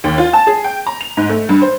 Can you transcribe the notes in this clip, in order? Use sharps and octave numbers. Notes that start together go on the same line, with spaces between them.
D#2
F4
A5
G#4
G5
A#5
F7
G#2
A3
G2
C5